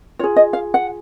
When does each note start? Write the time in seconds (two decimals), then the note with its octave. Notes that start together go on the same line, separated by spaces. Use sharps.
0.19 F4 G#4 C#5
0.36 D#5
0.53 F5
0.74 F#5